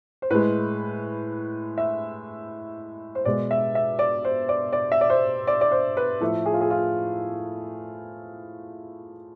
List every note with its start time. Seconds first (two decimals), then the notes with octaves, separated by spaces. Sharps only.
0.22 C5
0.30 A2 G#3 B4
1.78 E5
3.15 C5
3.25 B2 G#3 D5
3.51 E5
3.75 E5
3.99 D5
4.25 C5
4.49 D5
4.73 D5
4.92 E5
5.01 D5
5.10 C5
5.47 D5
5.61 D5
5.72 C5
5.97 B4
6.20 A2 F3 A3 A4
6.46 G#4
6.53 F4
6.61 G#4
6.70 F4